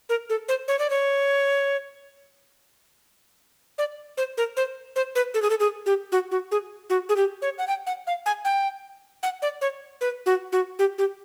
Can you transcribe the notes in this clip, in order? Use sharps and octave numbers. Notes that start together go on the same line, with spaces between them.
A#4
A4
C5
C#5
D5
C#5
D5
C5
A#4
C5
C5
B4
A4
G#4
A4
G#4
G4
F#4
F#4
G#4
F#4
G#4
G4
C#5
F#5
G5
F#5
F5
G#5
G5
F#5
D5
C#5
B4
F#4
F#4
G4
G4